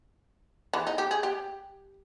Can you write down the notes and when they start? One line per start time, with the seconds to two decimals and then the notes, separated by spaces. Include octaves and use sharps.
0.73 E3
0.87 D#4
0.98 G4
1.11 G#4
1.23 G4